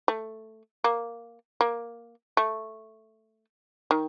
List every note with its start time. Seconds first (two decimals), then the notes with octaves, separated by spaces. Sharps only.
0.08 A3
0.84 A#3
1.61 A#3
2.37 A3
3.91 D#3